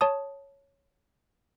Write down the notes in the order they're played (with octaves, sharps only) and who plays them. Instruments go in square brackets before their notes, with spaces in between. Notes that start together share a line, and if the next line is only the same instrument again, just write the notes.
[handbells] C#5 A5 D#6